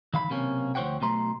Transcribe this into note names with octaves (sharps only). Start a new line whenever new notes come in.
D#3 F5 B5
B1 C3 A#3 C#4
D2 F3 C5 C#5 F#5 G5
B1 B2 A3 A#5 C6